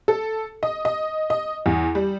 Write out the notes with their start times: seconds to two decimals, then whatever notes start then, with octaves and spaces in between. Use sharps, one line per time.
0.08 A4
0.63 D#5
0.85 D#5
1.30 D#5
1.66 E2
1.95 G3